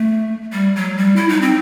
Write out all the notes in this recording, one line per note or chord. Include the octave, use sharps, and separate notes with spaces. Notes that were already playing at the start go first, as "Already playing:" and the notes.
Already playing: A3
G3
F#3
G3
E4
D#4
C4